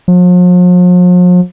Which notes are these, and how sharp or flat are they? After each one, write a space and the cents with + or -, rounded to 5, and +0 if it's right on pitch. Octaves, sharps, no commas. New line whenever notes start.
F3 +45